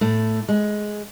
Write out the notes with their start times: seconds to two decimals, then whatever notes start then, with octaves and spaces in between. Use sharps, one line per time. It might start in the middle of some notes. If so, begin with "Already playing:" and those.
0.01 A2 A3
0.48 G#3